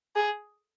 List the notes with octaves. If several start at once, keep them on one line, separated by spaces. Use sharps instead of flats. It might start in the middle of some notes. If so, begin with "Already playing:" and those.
G#4